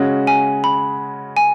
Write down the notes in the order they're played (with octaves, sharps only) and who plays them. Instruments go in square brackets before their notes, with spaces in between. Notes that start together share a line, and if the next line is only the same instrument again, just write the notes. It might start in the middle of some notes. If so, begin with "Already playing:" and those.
Already playing: [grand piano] C#3 G#3 C#4 F#4
[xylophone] G#5
B5
G#5